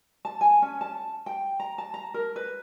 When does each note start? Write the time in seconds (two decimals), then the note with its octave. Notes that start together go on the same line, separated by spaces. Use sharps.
0.25 A5
0.41 G#5
0.62 C#4
0.81 A5
1.26 G5
1.60 A#5
1.78 A5
1.94 A#5
2.14 A#4
2.36 B4